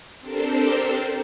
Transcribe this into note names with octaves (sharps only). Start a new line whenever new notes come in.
C4 D4 G4 A4 A#4 C5